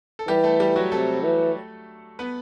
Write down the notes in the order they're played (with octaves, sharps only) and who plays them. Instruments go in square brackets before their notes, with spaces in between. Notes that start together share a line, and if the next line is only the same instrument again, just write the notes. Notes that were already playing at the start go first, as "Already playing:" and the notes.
[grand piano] A4
[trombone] E3 [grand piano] G3 G4
[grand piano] A3 A4
G3 G4
F#3 F#4
[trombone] C3 [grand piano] A3 A4
[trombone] E3
[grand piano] B3 B4